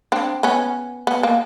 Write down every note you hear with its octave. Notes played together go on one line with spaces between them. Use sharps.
C4 D4
B3 C#4
B3
A#3